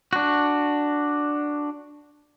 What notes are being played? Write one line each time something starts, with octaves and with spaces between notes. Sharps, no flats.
D4 F#4